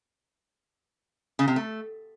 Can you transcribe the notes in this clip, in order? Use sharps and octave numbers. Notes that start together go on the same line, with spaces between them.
C#3
C3
A3